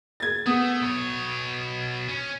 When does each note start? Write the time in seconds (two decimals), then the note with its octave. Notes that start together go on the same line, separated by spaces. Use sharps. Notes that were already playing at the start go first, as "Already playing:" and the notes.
0.20 G#6 A6
0.46 A3 B3 D#6
0.82 B2 C#5
2.09 C#4